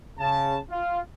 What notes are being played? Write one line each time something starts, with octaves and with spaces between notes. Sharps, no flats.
C#3 A5
F4